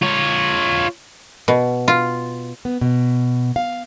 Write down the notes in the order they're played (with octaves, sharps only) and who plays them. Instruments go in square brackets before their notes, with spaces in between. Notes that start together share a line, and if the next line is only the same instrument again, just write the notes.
[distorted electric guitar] F4 C#5
[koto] B2
F4
[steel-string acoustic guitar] B3
B2
F5